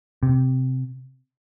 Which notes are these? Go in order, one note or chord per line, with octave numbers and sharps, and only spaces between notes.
C3